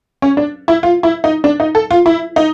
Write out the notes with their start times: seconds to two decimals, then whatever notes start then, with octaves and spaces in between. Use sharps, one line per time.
0.22 C#4
0.37 D4
0.68 E4
0.83 F4
1.03 E4
1.24 D#4
1.44 D4
1.60 D#4
1.75 A4
1.91 F4
2.06 E4
2.36 D#4